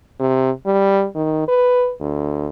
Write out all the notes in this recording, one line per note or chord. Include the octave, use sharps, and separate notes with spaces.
C3
G3
D#3
B4
D2